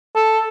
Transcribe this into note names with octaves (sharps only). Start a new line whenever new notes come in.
A4